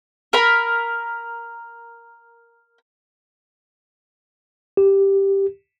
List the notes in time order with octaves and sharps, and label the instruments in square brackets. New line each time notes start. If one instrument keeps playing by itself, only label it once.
[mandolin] A#4 B5
[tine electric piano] G4